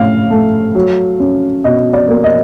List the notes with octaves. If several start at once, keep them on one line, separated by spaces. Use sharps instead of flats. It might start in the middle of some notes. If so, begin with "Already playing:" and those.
Already playing: A2 C#4 F5
A3
F#3
C#4
B2 D#5
D5
A#3
D#5